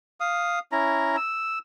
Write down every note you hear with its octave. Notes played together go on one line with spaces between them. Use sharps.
F5 D#6
C#4 E4 A#5
E6